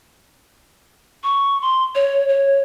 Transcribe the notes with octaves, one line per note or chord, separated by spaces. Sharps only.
C#6
C6
C#5
C#5